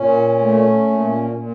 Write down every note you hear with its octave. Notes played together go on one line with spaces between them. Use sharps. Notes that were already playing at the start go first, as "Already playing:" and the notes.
Already playing: A#2 C#4
A3
A#2
A#2